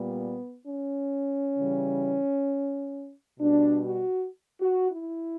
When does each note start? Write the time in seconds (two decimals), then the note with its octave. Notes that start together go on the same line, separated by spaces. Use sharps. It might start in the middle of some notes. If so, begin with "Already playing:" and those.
Already playing: A#2 G3 B3
0.67 C#4
1.58 C#3 E3 G3
3.40 B2 G3 D4
3.86 F#4
4.61 F#4
4.91 E4